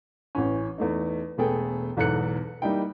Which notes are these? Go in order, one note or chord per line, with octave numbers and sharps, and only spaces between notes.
A1 E3 C#4
E2 A3 D#4
E1 A3 B3 G#4 A4 G5
B1 E2 G#2 A4 F#6 C#7
G3 A#3 D#4 E4 G5